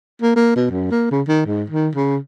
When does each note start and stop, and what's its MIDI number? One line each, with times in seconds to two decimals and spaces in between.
0.22 0.35 58
0.36 0.51 58
0.56 0.67 47
0.70 0.89 42
0.91 1.08 58
1.11 1.22 49
1.28 1.45 51
1.46 1.64 44
1.70 1.89 51
1.95 2.17 49